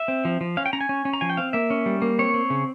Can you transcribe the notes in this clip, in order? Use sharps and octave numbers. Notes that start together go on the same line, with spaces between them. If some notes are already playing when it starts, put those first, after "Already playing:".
Already playing: E5
C4
F3
F3
C#4 F5
G5
C#4 A#5
G#5
C#4
C#4
A#5
F3 G#5
G5
C4 F5
A#3 E5
C#4
G3
A#3
C4 C#5
C4
C#3